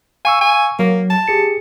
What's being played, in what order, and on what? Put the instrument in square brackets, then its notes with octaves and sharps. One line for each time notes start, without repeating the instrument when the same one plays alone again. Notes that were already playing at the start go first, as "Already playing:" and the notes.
[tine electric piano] F5 C#6 E6 [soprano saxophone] G#5
[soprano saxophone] G#5
[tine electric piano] F#3 [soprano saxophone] A#3
[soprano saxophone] A5
[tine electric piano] G4 G#4 C#7